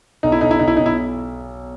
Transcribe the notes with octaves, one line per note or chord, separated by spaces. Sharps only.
B1 D#4
E4
B1 D#4
E4
B1 D#4
E4
B1 D#4
E4